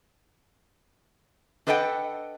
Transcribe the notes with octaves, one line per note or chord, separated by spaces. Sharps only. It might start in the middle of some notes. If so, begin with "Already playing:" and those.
D4 A4 B4 D#5 F#5 G5